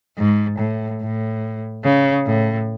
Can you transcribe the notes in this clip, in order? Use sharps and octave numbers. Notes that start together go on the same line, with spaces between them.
G#2
A2
A2
C#3
A2